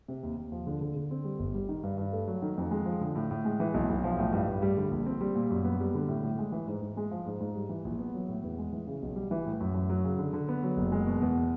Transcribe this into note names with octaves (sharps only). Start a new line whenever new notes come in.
C3
D#2
D#2
F3
D3
D3
D3
C4
G3
G1
G3
D#3
G2
G2
A3
F#3
D#3
F2
G#3
F3
D3
A2
A2
G#3
E3
B1
B1
F3
A2
G2
G2
G3
D3
A#1
C4
G3
A#2
F#2
B3
G3
D3
A2
A2
G#3
E3
G#2
G#2
G#3
F3
G#2
G#2
G3
E3
A#1
B3
F#3
A2
E2
G#3
E3
C#3
B1
G3
E3
A2
F#2
F#2
F#3
C#3
D3
D3
B3
F#3
F#1
G#3
B2
E2